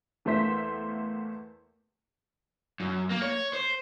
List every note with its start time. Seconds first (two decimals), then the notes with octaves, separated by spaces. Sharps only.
0.25 E2 A3 A#3 C5 E5 B6
2.80 F#2
3.10 A#3
3.22 C#5
3.53 C5